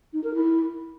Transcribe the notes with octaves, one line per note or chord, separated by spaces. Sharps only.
D#4
A#4
E4